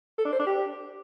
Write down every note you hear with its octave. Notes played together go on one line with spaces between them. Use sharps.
A4
D4
C5
D4
G4